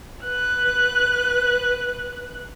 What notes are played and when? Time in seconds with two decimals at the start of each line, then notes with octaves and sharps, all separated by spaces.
0.23 B4 F#6